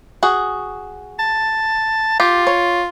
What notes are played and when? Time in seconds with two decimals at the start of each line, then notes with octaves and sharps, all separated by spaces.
0.23 F#4 G#4
1.19 A5
2.20 F4 G4
2.47 C#5